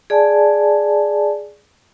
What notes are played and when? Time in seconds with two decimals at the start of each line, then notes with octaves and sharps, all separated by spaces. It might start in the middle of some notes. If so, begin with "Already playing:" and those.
0.10 G#4 D5 G#5 A5